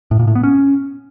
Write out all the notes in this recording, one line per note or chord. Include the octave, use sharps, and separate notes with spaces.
A2
A#2
A2
B3
C#4